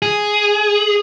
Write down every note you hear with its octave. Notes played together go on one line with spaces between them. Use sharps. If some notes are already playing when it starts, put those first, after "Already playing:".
G#4